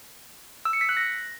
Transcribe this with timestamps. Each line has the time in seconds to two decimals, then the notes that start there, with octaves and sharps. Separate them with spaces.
0.65 E6
0.73 C#7
0.81 B6
0.89 F#6
0.97 A#6